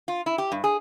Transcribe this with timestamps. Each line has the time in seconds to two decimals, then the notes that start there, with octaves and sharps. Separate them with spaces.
0.08 F4
0.26 E4
0.38 G4
0.52 G2
0.64 G#4